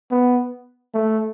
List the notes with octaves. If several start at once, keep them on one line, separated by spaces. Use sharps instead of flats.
B3
A3